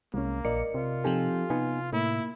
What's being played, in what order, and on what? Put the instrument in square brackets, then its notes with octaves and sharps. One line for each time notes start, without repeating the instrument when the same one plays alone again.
[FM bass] C2 [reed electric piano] G#3 C#4 [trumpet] A#3
[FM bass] A#1 [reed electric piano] A#4 D5 D#5 [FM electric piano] C#7
[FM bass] C3 [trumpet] F4
[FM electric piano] F3 C4 D#4 [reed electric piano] G4 A4 G#5
[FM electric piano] C3 [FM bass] B3 [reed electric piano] D#4 G#5
[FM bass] A2 [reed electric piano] A#3 [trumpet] E4